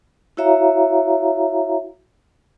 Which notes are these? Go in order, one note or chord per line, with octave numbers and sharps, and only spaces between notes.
E4 F#4 C#5 E5 F5 A#5